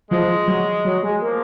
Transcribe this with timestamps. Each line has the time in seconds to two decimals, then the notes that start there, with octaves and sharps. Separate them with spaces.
0.11 F3 G#3
0.48 F#3
0.85 F#3
1.03 G#3
1.22 F3 A#3